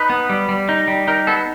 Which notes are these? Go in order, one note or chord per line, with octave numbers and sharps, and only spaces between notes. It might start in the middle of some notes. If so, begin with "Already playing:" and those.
Already playing: D#4 B4
B3
G3
G3
D#4
G3
D#4 A#4
B3 A4